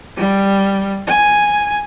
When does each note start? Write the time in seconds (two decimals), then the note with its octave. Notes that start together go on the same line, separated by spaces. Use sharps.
0.17 G3
1.07 G#5